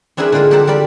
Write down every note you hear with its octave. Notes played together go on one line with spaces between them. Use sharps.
C4 D4 E4 G#4 A#4 B4
D3 G#3 A#3 F4 A#4
G4 A4 A#4 C5 F#5 A5
G3 A#4 D5 B5